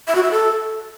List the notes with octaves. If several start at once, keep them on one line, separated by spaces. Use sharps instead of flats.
E5
F#4
E5
A4